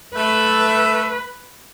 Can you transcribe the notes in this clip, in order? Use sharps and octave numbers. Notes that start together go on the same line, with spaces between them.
A3 B4